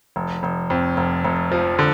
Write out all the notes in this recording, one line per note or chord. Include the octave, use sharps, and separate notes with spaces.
F1
F1
F2
F1
F1
F3
D3